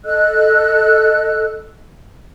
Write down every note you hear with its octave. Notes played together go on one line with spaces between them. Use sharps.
A4 D#5 E6 F#6